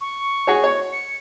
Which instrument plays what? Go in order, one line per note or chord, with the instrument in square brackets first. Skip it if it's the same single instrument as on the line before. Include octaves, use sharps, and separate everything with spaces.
[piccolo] C#6
[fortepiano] F#4 G#4 C#5
C#5
[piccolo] C#7